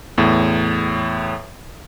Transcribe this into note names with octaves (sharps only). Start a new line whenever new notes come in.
E2 A2